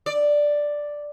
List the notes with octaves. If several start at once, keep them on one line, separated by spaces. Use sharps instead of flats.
D5